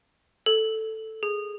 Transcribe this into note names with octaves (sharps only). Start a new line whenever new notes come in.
A4
G#4